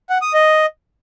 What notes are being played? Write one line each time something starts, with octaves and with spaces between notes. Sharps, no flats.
F#5
D#6
D#5